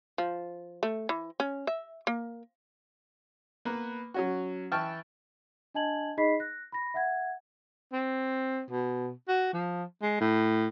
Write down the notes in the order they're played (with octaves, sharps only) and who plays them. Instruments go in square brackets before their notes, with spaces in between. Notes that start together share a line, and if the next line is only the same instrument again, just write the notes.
[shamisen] F3
A3
E3
C#4
E5
A#3
[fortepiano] A#3 B3 B4
F#3 C#4 F#4
E3 G5 A5 C#6 F6
[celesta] D4 D#5 G#5 A5 G#6 F#7
D#4 G#4 D#5 B5 B6 C7
F#6 A#6
B5 A#6
E5 F#5 G#6
[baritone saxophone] C4
B2
F#4
F3
G#3
A2